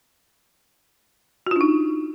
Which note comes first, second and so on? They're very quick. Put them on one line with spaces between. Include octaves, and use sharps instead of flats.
F#4 F4 D4 D#4